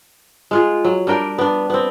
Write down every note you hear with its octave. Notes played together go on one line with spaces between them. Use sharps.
G#3 F4 G#4
F#3
G3 D4 A#4 G5
B3 D4
B3 C4